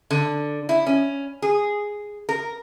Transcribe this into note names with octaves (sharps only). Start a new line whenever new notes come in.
D3
E4
C#4
G#4
A#4